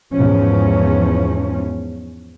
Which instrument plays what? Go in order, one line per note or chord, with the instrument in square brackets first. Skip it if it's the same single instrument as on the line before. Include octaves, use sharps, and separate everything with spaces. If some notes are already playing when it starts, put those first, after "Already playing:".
[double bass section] E2 G#2 F3 C#4